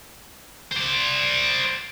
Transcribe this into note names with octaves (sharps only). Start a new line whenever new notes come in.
C5 D5